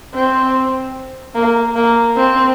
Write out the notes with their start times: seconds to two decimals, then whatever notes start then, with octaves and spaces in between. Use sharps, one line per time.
0.15 C4
1.35 A#3
1.76 A#3
2.16 C4